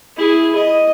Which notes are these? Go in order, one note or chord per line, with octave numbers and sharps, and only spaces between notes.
E4 G#4
D#5